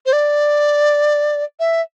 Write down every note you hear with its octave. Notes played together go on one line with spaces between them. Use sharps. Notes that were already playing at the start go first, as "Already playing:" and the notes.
C5
D5
E5